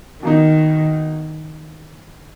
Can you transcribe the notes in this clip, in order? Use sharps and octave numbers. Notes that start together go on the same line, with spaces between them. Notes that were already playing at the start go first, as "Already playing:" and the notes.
B2 D#3 A#3 D#4